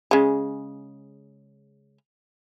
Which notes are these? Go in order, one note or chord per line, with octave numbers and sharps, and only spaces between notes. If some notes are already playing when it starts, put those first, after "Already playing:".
C#3 G#3